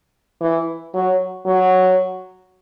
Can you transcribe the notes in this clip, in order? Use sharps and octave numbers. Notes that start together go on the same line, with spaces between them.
E3
F#3
F#3